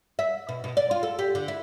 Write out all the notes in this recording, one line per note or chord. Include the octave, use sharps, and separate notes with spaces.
E5
B2
B2
D5
F4
A4
G4
D3
E4